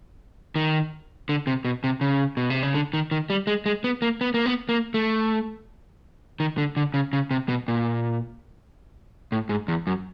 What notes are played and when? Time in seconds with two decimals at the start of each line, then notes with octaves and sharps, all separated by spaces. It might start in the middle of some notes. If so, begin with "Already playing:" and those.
0.56 D#3
1.29 D3
1.47 C3
1.65 B2
1.84 C3
2.01 C#3
2.37 B2
2.50 C3
2.63 C#3
2.74 D3
2.93 D#3
3.11 D#3
3.30 G3
3.47 G#3
3.66 G#3
3.84 B3
4.02 A#3
4.21 B3
4.34 A#3
4.46 B3
4.69 A#3
4.94 A3
6.40 D#3
6.58 D3
6.77 D3
6.94 C#3
7.13 C#3
7.31 C3
7.49 B2
7.68 A#2
9.32 A2
9.49 G#2
9.68 E2
9.87 F#2